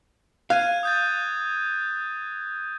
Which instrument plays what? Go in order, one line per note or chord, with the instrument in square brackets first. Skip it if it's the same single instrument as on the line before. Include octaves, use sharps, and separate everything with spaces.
[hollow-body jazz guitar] F5 [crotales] F#6 G#6 D#7
[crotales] D#6 G6 A6